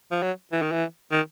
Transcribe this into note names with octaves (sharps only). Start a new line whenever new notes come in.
F3
F#3
E3
D#3
E3
D#3